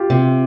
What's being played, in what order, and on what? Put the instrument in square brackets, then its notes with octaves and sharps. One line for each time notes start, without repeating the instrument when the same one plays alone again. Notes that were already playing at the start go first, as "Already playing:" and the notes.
Already playing: [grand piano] F4 G4
[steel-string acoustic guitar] C3